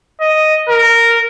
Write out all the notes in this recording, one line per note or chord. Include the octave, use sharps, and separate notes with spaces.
D#5
A#4